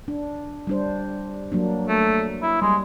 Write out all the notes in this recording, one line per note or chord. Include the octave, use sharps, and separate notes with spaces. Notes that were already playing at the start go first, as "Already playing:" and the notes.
D4
G3 D4 C5
F#3 A#3 D4
A3
E4
G3 G#3